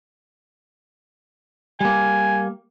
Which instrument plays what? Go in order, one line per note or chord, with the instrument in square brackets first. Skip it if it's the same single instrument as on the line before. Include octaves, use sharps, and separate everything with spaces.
[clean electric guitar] G3 A#3 [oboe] G#5